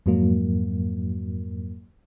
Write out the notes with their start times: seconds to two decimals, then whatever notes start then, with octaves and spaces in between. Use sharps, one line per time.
0.06 F2 G#2 F#3 A#3